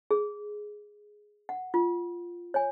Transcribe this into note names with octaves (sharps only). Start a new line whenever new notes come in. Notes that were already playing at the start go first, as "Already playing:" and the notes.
G#4
F#5
F4
C#5 G#5